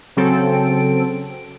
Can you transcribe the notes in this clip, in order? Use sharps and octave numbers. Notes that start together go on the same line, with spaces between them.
C#3 F#3 C4 A4 D7